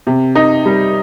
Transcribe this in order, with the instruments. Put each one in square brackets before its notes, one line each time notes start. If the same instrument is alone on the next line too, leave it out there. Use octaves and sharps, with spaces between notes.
[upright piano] C3
D#4
G3